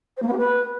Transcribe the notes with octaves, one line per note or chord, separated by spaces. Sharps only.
C5
A#3
B3
G4
B4